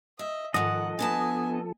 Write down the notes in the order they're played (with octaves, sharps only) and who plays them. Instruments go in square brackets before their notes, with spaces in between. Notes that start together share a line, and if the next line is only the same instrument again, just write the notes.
[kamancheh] D#5 [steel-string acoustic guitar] E5
[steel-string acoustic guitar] G#2 D#3 [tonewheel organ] F3 A4 [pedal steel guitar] D#5 [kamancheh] F#5
[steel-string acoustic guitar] D3 B3 A5 [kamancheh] G#5